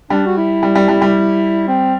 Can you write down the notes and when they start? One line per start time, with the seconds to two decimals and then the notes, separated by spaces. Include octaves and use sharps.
0.10 G3 D4
0.26 F#4
0.37 E4
0.63 G3
0.75 G3
0.89 G3
1.02 G3
1.67 C4